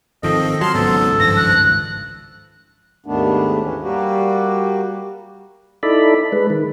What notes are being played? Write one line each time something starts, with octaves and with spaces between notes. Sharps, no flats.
G#1 D#3 F3 C4 A4 D#5
F#3 A5 C6 F6
G#1 C#2 G#2 F#3 B3 A4
G2 F3 A#6
F#6
D#2 G#2 D#3 A3 B3 D4
E3 C#4
G3 A#3 F#4 G4
D#4 E4 A4 D5 B5
G#3 B4
D#3